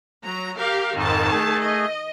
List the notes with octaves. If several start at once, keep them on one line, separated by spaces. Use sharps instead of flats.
F#3 A#5
G4 A#4 F5
F2 G#2 D#3 A5
A3 G#4
D#5